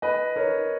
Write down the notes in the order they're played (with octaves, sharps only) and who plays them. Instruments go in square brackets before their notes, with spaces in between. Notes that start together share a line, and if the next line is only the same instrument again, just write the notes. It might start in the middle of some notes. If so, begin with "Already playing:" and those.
[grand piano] B4 D#5
A#4 C#5